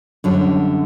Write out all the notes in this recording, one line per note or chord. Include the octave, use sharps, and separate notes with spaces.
F#2 D3 G3